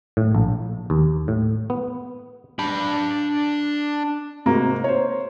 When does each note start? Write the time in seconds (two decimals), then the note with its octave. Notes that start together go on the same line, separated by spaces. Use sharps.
0.17 A2
0.35 A#1
0.90 D#2
1.28 A2
1.70 B3
2.59 D4 B5
4.46 G#2 C3 A#3 F#4
4.84 C5 C#5